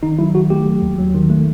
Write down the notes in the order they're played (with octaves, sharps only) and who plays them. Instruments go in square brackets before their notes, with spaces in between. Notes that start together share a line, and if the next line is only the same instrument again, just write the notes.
[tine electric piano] D#3 D#4
F#3 E4
D#3 F#4
A3 G4
F#3
D#2
F#3
D#3
A3